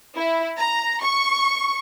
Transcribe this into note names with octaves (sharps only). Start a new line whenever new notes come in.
E4
A#5
C#6